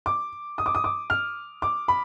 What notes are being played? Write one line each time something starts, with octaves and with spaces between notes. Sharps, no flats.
D6
D#6
D6
D#6
D6
F6
D6
B5